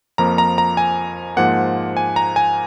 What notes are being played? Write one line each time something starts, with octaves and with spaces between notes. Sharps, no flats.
F2 F3 A#3 A#5
A#5
A#5
G#5
G#2 F3 A#3 F#5
G#5
A#5
G#5